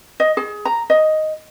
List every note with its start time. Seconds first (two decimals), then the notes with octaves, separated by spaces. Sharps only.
0.20 D#5
0.37 G#4
0.65 A#5
0.90 D#5